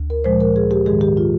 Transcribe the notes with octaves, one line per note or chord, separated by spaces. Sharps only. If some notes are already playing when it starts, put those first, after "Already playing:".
Already playing: D2
A#4
A#2 F3 G#3 C5
A#4
G#4
G4
G#2 D#3 G#3 G#4
G4
F4